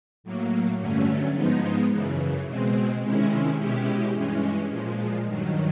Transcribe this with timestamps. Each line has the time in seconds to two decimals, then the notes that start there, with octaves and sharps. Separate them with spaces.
0.24 A2 F#3 A#3
0.79 G2 D3 F#3 A3 C#4
1.35 G#2 F3 G#3 B3 D#4
1.91 F#2 C#3 E3
2.47 B2 G#3 C4
3.02 C3 D#3 G#3 C#4 E4
3.58 B2 G#3 C#4 E4 G4
4.14 G2 E3 G#3 C#4
4.70 A#2 F3 G#3
5.26 G2 D#3 F#3